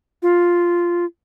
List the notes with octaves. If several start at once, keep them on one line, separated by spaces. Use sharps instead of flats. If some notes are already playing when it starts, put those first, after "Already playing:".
F4